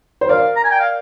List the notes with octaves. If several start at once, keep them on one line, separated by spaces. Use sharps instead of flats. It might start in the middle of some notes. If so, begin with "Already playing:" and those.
C5
A#4 D5 F5
A#5
G#5
G5
F5